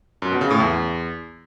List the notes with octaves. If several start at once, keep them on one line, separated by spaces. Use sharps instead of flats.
F#2
B2
C#3
A2
E2